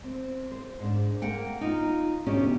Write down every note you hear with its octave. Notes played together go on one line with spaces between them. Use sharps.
C4
C5
G#2 D4
A#3 F#5 G5
D#4 F4
D2 B2 C#4 D4 G4